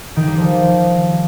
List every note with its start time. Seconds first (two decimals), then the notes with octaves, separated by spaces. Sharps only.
0.16 D#3
0.27 G3
0.37 F3